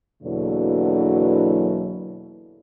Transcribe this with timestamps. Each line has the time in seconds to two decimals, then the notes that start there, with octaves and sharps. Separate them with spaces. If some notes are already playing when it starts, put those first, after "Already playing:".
0.23 E2 B2 D3 F#3 A#3 E4